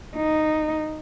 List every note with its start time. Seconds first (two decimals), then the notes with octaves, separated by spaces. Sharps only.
0.15 D#4